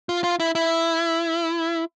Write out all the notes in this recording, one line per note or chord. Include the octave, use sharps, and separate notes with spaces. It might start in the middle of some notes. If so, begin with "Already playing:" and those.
F4
F4
E4
E4